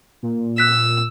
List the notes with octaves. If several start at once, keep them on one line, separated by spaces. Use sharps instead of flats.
A#2
E6 F#6 B6